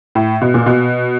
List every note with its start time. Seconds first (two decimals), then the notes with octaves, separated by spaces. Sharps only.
0.15 A2
0.41 B2
0.54 A#2
0.66 B2